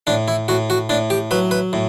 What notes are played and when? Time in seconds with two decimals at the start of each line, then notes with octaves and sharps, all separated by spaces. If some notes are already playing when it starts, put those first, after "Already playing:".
0.07 A2 D4
0.28 E4
0.48 A2 F#4
0.70 F#4
0.89 A2 D4
1.10 G4
1.31 F#3 B4
1.51 B4
1.73 A2